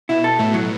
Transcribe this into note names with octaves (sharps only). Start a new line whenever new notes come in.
B2 E4
A4
A2 A3
F#3